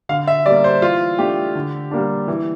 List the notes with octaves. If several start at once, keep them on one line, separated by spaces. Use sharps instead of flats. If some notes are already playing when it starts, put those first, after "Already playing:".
D3 F5
E5
G3 A#3 D5
C5
E3 F4
A3 D4 G4
D3
G3 A#3 D4
E3